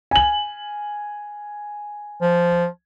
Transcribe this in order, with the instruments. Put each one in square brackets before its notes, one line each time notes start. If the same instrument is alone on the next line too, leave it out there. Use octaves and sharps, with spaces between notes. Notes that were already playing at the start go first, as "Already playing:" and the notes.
[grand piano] G#5 F#7
[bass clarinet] F3